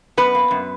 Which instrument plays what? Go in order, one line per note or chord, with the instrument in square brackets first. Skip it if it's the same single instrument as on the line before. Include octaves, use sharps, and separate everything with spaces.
[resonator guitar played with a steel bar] F#2 B3 B4
A#3
F#2